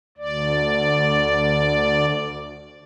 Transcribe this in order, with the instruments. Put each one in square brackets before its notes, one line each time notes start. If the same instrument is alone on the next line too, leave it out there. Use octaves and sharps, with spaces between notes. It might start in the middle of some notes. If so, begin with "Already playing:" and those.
[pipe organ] D2 D5